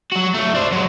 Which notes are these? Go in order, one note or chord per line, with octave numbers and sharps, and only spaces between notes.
F#3 F#4
F#3 A3
D4 C5
F#3 G#3